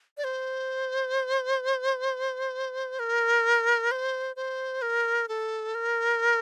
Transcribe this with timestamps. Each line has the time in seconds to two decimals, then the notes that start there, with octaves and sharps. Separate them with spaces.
0.18 D5
0.24 C5
2.99 A#4
3.91 C5
4.36 C5
4.82 A#4
5.28 A4
5.75 A#4